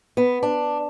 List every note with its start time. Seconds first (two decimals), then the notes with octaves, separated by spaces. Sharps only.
0.17 B3
0.43 D4